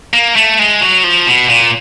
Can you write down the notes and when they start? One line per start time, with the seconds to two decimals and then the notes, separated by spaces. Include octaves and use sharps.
0.14 A#3
0.36 A3
0.59 G#3
0.81 F#3
1.04 F3
1.27 B2
1.49 A#2